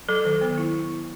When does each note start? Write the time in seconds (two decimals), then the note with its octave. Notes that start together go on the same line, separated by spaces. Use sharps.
0.09 F#3 A4
0.25 D#3
0.41 B3
0.58 E4